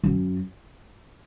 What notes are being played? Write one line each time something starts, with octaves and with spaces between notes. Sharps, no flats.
F#2